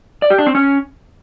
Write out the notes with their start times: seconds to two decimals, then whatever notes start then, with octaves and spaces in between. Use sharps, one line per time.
0.22 D5
0.30 G4
0.38 D4
0.47 C4
0.55 C#4